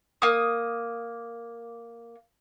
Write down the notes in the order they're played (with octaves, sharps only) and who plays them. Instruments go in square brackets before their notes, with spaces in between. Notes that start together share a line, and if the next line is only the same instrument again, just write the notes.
[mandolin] A#3 D#6